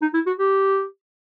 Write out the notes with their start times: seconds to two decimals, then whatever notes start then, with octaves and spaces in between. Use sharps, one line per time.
0.01 D#4
0.14 E4
0.26 F#4
0.39 G4